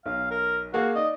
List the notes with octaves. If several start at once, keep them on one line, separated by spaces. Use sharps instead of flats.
B1 F5
A#4
A#3 F#4 G#4 F5
D#4 D5 D#5